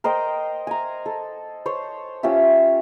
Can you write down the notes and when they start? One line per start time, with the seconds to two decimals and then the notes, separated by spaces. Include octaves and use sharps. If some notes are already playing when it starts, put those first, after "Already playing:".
0.04 A#4 C5 D#5 G5
0.67 G#5 A#5
1.06 A4
1.66 C5 C#5
2.23 C#4 F4 G4 E5